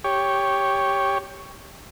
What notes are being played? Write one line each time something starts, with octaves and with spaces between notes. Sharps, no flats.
G4 C#5